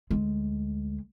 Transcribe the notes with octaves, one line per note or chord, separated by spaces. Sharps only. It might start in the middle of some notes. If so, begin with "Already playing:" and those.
D2 G#3